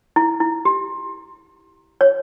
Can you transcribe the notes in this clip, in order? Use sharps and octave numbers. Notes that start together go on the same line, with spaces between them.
E4
E4
G4
C#5